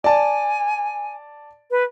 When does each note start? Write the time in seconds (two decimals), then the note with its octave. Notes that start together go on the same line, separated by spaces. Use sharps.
0.04 D5 G#5 A5
1.70 B4